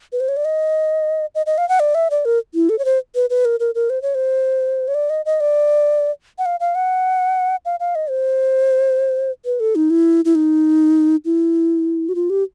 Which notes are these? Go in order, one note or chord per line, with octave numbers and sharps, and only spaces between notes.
B4
C5
C#5
D5
D#5
D#5
D#5
F5
F#5
D5
E5
D5
A#4
E4
A4
C#5
C5
B4
B4
A#4
A#4
A#4
C5
C#5
C5
C#5
D5
D#5
D#5
D5
F#5
F5
F5
F#5
F5
F5
D#5
C5
B4
A4
D#4
E4
E4
D#4
E4
F#4
F4
G4